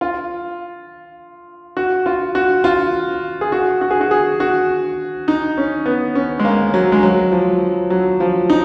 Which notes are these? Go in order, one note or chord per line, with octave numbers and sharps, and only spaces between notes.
F4
F#4
F4
F#4
F4
G#4
F#4
F#4
G#4
F#4
G#4
F#4
D#4
C#4
B3
C#4
G#3
A#3
F#3
G#3
F#3
F3
F#3
F3
D#4